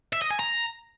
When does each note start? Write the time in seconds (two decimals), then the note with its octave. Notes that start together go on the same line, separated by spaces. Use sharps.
0.13 E5
0.22 D#5
0.31 G#5
0.39 A#5